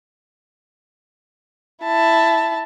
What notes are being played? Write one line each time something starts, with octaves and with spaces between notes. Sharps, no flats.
E4 A5